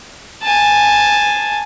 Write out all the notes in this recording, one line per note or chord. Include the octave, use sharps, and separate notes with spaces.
G#5 A5